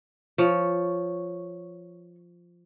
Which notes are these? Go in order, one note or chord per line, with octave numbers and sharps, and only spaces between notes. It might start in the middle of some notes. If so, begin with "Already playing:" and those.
F3 C#5